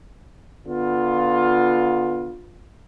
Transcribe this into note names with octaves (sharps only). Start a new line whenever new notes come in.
D3 B3 F4